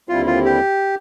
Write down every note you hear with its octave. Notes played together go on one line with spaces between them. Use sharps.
D#2 D3 G3 C4 E4 F4
F4
G4